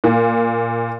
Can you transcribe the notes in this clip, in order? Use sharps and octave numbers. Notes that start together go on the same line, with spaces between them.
A#2